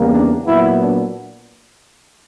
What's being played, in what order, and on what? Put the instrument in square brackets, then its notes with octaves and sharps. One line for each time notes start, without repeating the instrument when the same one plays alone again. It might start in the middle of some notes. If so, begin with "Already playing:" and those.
Already playing: [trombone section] E2 C#3 G3 A#3
D4
A#2 F#3 B3 E4
D4